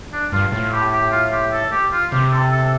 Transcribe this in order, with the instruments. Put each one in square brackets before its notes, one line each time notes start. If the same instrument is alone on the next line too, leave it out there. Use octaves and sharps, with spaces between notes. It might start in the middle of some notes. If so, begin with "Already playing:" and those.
[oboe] D4
[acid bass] G2 [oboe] F4
[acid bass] A2 [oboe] F4
[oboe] G4
G4
F4
G4
A4
G4
F4
[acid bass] C3 [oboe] G4
[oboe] A4
A4